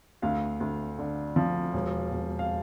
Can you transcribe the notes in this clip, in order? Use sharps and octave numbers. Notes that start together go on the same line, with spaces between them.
D2 F5
D2
D3
F3
E1
E1
F5